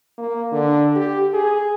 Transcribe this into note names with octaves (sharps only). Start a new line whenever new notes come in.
A#3
D3
G4
G#4